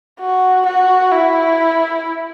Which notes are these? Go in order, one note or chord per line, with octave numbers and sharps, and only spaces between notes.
F#4
F#4
E4